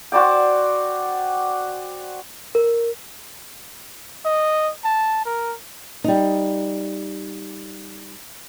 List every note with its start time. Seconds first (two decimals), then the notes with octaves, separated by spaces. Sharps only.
0.12 F#4 C5 D5 G5
2.55 A#4
4.26 D#5
4.85 A5
5.26 A#4
6.04 G3 D#4